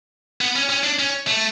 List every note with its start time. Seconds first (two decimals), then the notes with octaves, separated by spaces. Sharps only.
0.41 B3
0.56 C#4
0.70 C#4
0.84 D4
0.99 C#4
1.27 A3